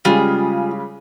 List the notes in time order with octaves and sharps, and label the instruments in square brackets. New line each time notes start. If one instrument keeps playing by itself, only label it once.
[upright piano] C#3 G3 G#3 [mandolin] F4 G#4